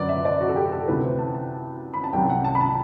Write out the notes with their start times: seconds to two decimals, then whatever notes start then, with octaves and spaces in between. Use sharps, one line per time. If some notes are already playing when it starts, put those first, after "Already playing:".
Already playing: F#2 D3 F#3 B4 D5
0.09 E5
0.25 D5
0.40 F#4
0.49 A4
0.56 G4
0.72 A4
0.88 D2 C3 E3 B4
1.04 C5
1.19 A5
1.35 A5
1.94 B5
2.04 A5
2.13 C2 C3 F#3 G5
2.30 F#5
2.44 A5
2.55 B5
2.61 A5